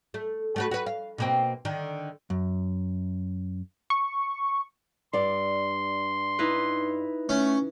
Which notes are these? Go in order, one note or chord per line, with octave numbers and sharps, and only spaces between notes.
A3
A3 F#4 B4
F#4 B4
F5
B2 A#3 C4
D3 D#3
F#2
C#6
G2 D5 C6
D#4 E4 B4
A3 C#4